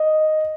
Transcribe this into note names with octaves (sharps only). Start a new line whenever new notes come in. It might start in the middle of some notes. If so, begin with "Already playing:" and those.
Already playing: D#5